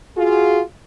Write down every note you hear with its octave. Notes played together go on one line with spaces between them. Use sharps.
F4 F#4 G#4